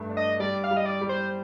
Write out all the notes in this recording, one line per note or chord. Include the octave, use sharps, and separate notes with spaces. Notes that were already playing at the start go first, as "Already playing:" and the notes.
Already playing: G2 A3
D4
D#5
G3 D5
F5
G3
D#5
D5
G3
C5